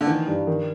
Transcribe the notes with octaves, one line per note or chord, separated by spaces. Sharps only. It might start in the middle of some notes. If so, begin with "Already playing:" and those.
D3
D#3 E3
G2
D#3